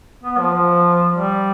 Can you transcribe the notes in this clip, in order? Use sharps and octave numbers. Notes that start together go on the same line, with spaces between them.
B3
F3
F3
G3